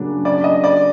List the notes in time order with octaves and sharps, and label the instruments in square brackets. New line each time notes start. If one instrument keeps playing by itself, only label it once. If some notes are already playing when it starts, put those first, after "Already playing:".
Already playing: [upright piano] C#3 F#3 A#3 D4
[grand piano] D5
D#5
D5